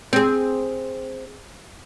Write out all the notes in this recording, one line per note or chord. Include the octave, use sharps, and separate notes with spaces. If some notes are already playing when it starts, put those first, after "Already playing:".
C4 G#4